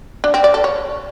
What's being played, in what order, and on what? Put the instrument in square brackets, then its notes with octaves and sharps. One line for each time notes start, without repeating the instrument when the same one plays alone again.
[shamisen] D4
C4
D5
A4
C#5